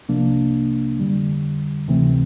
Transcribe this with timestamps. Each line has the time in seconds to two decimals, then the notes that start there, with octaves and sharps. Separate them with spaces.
0.09 C2 C3 F3 A#3 D4
0.99 F2 D3 G3
1.88 D2 C3 E3 A3 C4